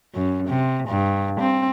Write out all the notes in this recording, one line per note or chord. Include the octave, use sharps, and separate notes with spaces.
F#2
C3
G2
C4